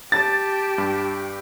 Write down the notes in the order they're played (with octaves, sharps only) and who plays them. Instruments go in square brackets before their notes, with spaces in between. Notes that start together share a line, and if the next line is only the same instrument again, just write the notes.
[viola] G4 [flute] A5 [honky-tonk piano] A6
[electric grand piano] G2